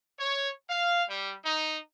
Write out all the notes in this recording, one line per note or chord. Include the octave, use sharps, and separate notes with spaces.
C#5
F5
G3
D#4